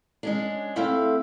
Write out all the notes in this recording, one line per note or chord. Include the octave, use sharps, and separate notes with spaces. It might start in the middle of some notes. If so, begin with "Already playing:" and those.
G#3 C#4 D4
A3 C4 E4 A4 E5 F5